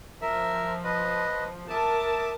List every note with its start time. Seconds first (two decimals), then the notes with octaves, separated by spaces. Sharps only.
0.22 F3 A#4 E5
0.84 B4 D#5
1.70 A#4 E5 A5 D6 D#6